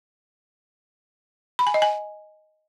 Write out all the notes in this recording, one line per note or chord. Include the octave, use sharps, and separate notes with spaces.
B5
G#5
D#5
G#5